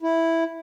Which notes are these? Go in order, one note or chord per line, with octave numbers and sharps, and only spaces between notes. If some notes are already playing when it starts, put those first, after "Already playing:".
E4